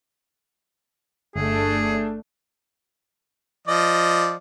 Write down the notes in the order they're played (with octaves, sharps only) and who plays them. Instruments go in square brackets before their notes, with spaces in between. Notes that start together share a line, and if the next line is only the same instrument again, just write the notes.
[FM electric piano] G1 [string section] A3 D4 [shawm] G#4
[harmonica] F3 D5 D#5